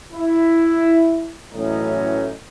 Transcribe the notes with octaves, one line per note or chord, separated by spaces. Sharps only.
E4
A1 A2 E3 F#3 C#4 D#4